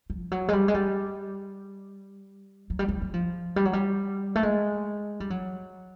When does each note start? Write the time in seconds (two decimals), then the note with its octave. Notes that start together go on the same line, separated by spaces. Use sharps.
0.10 F3
0.32 F#3
0.48 G#3
0.53 G3
0.68 G#3
0.74 G3
2.70 F#3
2.79 G3
2.88 F#3
3.02 F#3
3.14 F3
3.56 G3
3.65 F#3
3.73 G3
4.35 A3
4.43 G#3
5.20 G3
5.30 F#3